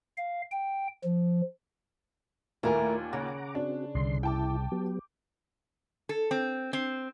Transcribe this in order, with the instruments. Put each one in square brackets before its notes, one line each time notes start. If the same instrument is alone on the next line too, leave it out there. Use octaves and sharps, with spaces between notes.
[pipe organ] F5
G5
F3
[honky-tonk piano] D#2 A#2 G#5 [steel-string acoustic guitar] A3 E4 A#4
[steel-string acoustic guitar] C#3 [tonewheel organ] F#5 A#5 D6
[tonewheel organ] C4 F#4 [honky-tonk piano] D4
[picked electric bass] C2 [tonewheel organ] D3 C6
[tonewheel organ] E4 [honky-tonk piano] G5 A5 D6
[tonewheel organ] F#3 B3 G4
[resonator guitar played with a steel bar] A4
C4
C4